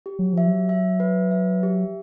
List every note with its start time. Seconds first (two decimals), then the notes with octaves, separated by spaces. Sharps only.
0.06 G4
0.19 F#3
0.33 F3 E5
0.47 F#3
0.69 E5
1.00 B4
1.31 E5
1.63 G4